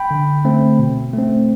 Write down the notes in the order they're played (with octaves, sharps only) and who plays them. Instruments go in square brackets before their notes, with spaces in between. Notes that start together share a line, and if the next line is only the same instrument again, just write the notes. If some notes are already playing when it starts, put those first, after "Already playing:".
Already playing: [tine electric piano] G5 B5
D3
A3 C4
B2
A3 C4